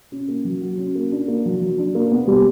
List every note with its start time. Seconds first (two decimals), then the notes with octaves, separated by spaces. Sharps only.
0.12 C#4
0.28 A#3
0.44 F#3
0.62 F#4
0.78 C#4
0.95 A#3
1.12 D4
1.28 A#3
1.45 F#3
1.61 F#3
1.78 D4
1.95 A#3
2.11 B3
2.27 G3